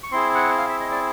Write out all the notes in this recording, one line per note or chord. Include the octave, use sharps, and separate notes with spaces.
C#6
C4 E4 G#4 C6
F#5
F5
E5
D#5
D5